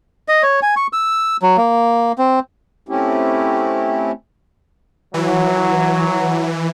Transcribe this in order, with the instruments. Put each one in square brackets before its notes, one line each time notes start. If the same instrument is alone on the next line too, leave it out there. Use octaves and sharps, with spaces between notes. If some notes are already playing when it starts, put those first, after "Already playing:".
[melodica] D#5
C#5
G#5
C#6
E6
F#3
A#3
C4
[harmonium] A3 C4 C#4 E4 G4
[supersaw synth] E3 [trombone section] F#3